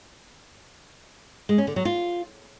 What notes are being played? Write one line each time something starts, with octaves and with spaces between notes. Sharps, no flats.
G#3
C#4
D3
F#3
F4